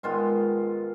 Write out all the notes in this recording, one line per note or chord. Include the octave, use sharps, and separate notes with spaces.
G#2 D#3 G#3 B3 F4